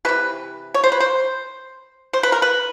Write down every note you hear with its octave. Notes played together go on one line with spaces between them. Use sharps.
C3 E3 G#3 B4
C#5
C5
B4
C5
C5
B4
A#4
B4